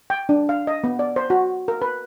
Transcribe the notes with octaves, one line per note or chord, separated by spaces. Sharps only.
G5
D4
F5
D#5
B3
D5
C5
F#4
A#4
B4